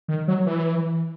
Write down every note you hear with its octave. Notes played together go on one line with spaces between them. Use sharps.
D#3
F#3
E3